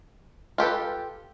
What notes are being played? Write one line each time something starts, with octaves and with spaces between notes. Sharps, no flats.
F4 G4 A4 B4